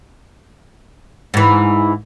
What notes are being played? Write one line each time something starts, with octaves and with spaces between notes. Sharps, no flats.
G#2 E3